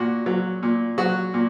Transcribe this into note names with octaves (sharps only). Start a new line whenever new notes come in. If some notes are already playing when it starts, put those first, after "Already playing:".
Already playing: A#2 F#4
F#3
A#2
F#3 F#4
A#2